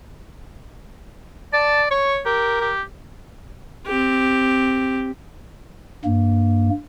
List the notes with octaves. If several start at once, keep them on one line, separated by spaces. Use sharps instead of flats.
D5 A5
C#5 C#6
G4 A#4
G4
C4 G4
G2 A#3